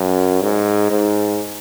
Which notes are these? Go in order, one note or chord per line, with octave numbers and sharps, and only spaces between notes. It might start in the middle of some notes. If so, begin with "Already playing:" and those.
Already playing: F#2
G#2
G#2